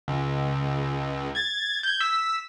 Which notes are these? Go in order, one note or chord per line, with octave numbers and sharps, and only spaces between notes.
C#2
G#6 A6
G6 G#6
E6 B6